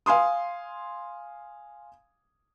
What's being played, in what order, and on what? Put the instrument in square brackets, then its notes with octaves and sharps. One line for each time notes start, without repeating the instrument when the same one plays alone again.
[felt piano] F5 G#5 C6 D#6